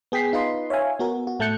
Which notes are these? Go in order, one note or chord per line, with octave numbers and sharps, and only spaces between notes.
B3 G#4 G5 B6 C7
D#4 F4 B4 D#5 C6
C#5 E5 F5 G#5
B3 F#4 A#4
F#4
A2 A3 A5 F#6 G6 C#7